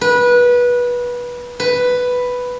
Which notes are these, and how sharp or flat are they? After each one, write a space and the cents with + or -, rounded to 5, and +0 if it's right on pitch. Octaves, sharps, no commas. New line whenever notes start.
B4 -20
B4 +5